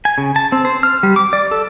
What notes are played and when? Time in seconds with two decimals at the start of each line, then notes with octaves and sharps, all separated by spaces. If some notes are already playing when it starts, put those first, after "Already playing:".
0.05 G#5
0.18 C#3
0.36 A5
0.52 C4
0.65 C5
0.83 F6
1.03 G3
1.16 D6
1.33 D5
1.51 A4